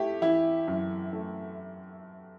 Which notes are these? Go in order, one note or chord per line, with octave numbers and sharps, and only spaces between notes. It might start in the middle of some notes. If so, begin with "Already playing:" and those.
Already playing: A3 E4 G4
E3 E4
F#2
A3